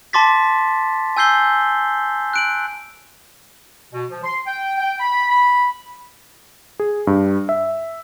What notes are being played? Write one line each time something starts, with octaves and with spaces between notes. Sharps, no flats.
A5 C6 D6 A6 B6
G#5 E6 G6 C7 G7
F#6 D7 F#7
B2
F3
C6
G5
G5
B5
B5
G#4
G2
E5